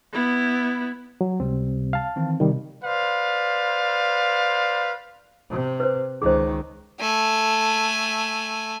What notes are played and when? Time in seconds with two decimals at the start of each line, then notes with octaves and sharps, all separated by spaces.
0.13 B3 E4
1.21 F#3
1.40 C#2 C3 G3 C4
1.93 F5 A5
2.16 D#3 E3 C4
2.40 C3 D#3 G3
2.84 B4 C5 D5 F5
5.50 C3
5.80 B4 C5
6.22 C#2 D#3 G#4 C5
7.00 A3 G#5